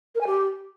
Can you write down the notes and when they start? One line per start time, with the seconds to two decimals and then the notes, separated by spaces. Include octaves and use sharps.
0.15 A#4
0.21 G#5
0.27 G4